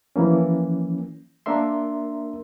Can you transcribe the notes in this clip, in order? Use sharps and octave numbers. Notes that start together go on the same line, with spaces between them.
E3 F3 A#3 C#4
A#3 D4 A#4 E5 C6